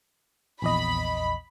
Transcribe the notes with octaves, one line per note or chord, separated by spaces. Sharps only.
A#1 E2 D#5 B5